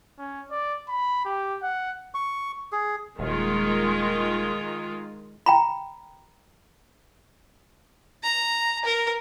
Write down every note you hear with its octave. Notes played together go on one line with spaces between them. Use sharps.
C#4
D5
B5
G4
F#5
C#6
G#4
D#1 D#3 G#3 F4
G5 A#5 B5
A#5
A#4